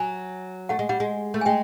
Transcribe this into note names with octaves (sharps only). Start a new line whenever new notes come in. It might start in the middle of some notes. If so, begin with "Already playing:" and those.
Already playing: F#3 G#5
A3 F#5
G#3
G3 F#5
G#3
A3
G#5
G#3 G5